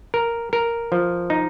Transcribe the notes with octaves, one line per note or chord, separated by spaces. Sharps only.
A#4
A#4
F3
D#4